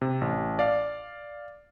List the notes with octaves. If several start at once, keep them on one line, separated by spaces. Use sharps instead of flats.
C3
A1
D5 F5